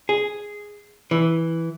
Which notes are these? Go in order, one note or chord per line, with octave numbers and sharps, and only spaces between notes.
G#4
E3